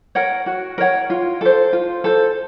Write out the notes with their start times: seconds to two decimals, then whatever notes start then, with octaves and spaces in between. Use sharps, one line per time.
0.15 A#4 C#5 F#5
0.46 F#4
0.78 A#4 C#5 F#5
1.10 F4
1.41 A4 C5
1.73 F4
2.04 A4 C5